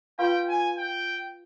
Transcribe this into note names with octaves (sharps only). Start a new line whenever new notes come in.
F4 B4 F5 G5 C6
G#5
G5